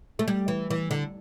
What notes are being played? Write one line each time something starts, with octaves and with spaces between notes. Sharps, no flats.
A3
G3
E3
E3
D3